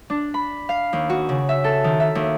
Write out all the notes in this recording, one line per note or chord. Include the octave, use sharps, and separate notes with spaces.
D4
B5
F5
D#2
F#4
C#3
E5
A4
D#3
E5
D#2